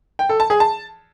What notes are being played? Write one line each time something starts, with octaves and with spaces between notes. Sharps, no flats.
G5
A4
A5
G#4
A5